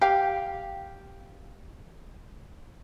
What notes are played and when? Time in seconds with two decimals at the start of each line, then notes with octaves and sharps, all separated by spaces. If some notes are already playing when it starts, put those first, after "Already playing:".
0.01 G4 F5